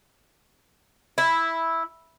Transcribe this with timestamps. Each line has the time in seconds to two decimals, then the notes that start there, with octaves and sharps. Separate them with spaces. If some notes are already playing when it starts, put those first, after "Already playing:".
1.18 E4